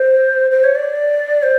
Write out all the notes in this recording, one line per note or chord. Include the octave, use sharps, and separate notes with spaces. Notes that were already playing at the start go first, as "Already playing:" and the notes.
Already playing: C5
C5
C#5
D5
C5